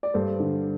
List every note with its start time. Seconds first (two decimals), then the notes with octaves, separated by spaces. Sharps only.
0.03 D5
0.14 G2 A4 C5
0.40 D3